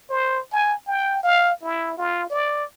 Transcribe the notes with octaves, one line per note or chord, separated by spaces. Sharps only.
C5
G#5
G5
F5
E4
F4
D5